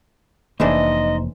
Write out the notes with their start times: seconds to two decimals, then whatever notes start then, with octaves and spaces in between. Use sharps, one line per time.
0.60 F1 E3 A3 A#3 D4 D#4 C5 D#5